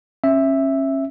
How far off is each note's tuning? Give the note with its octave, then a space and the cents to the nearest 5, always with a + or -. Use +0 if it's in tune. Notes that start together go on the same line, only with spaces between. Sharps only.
C#4 -30 E5 +0